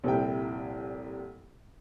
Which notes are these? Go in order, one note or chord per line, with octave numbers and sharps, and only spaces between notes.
F1 C2 A#2 E4 G5